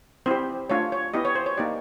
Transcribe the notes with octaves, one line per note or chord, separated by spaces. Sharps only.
C4 E4 G4 C5
A3 D4 F4 C#5
C#5
B3 E4 G4 D#5
C#5
C5
C#5
A#3 D#4 G4 D5